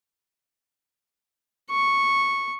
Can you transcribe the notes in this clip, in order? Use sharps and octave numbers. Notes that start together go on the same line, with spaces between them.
C#6